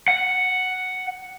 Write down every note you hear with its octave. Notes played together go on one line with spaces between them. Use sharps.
F#5